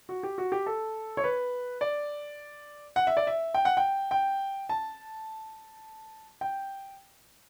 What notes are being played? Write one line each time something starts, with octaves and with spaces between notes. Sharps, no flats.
F#4
G4
F#4
G4
A4
C#5
B4
D5
F#5
E5
D5
E5
G5
F#5
G5
G5
A5
G5